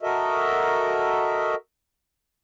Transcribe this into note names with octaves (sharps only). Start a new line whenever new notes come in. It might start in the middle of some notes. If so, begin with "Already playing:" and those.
F#4 A4 A#4 D#5 E5